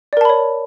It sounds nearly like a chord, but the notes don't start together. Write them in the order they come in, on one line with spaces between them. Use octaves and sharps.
D5 A#4 A5 B5 C#5